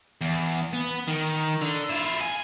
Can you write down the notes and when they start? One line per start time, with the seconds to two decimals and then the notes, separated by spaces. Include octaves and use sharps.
0.21 E2
0.73 B3
1.08 D#3
1.62 D3
1.90 E4 F4
2.21 G#5